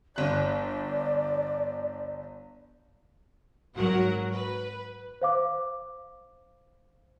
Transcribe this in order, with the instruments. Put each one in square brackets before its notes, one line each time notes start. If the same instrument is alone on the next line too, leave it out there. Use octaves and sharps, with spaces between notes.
[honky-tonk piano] G1 F#6 [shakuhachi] D5
[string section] G#1 F#3 F#4 A#4 F#5
B4
[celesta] C5 F5 D6